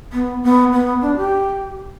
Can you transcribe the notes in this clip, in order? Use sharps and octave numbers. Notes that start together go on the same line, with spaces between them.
B3
B3
B3
D4
G4